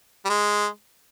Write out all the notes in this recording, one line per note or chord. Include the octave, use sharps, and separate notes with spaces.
G3
G#3